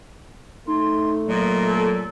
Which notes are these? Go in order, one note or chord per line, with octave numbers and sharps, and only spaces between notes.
A3 D#4 C6
A#2 F#3 D#5
A4